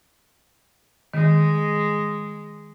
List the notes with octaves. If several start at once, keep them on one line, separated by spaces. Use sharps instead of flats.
D#3 G#3